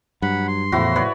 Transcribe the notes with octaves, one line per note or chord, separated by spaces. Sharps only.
G2 F#3 F#5 B5
C6
E2 A2 C#3 F3 E4 F#4
B4 C#5 D5